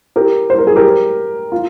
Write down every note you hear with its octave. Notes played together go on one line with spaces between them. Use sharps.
G4 A#4
C5
A#4
G#4
G4 A#4
F4